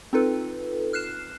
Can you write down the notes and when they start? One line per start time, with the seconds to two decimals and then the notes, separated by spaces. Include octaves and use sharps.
0.13 C4 D#4 F4 A4 B4
0.93 F6 F#6 C7 E7